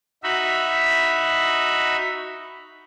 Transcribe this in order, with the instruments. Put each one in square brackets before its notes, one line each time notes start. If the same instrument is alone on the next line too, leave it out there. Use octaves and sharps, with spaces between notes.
[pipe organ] D#4 F#4 E5 B5